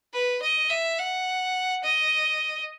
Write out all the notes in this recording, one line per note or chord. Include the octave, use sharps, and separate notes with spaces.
B4
D#5
E5
F#5
D#5